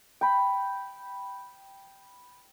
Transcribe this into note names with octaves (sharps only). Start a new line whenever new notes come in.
G5 B5